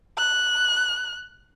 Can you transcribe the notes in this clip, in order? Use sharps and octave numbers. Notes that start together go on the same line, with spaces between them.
F#6